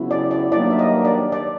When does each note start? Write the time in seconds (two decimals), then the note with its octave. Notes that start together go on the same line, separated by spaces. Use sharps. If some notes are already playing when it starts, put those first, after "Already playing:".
Already playing: C#3 F#3 B3 E4
0.11 D5
0.31 D5
0.52 G2 D#3 F#3 A#3 D4 D5
0.70 E5
0.79 D#5
1.05 D5
1.32 D5